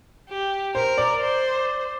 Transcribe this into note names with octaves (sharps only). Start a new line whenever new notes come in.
G4
A#4 C5
D5
C5